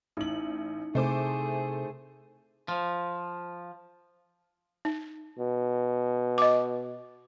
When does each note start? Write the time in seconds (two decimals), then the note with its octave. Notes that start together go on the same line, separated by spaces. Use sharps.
0.17 A1 D#4 E4 F#7
0.95 C3 A3 G#4 C5 D6
2.68 F3
4.85 D#4
5.39 B2
6.38 D#5 D6